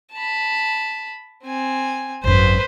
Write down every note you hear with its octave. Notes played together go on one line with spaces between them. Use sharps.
A5 B5
C4 G#5
G#1 F#2 B4 C5